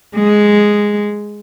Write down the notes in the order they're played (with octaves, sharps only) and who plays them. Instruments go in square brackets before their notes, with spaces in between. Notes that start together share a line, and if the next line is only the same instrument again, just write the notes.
[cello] G#3